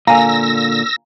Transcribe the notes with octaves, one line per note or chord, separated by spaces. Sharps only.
A#2 D3 A#3 F5 G#5 A#5 E6 A#6